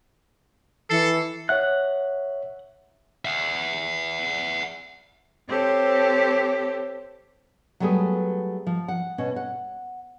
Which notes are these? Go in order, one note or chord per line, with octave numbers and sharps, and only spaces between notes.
E3 A4 C7 C#7
C#5 E5 F#5 F#6
E5 F#5
C4 G4 A4 C5 C#5
F#3 G3 A3 B3 G#4
F3
F#5
B2 C#4
F#5